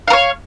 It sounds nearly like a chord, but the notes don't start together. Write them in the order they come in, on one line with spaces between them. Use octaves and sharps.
F5 A#4 C#5